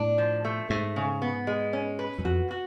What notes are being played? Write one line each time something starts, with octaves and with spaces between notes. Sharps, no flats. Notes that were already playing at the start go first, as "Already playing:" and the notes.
Already playing: A2 D4
F3
A3
G#2 A3
C#3
B3
G#3
C#4
B4
F#2
F2 F#4
F#4